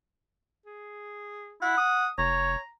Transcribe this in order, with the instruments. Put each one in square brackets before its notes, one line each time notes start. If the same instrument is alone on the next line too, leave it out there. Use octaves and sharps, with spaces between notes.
[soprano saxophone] G#4
[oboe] E4 [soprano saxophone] F#5
[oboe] D#6
[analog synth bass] F1 [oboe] C#5 [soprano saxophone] A#5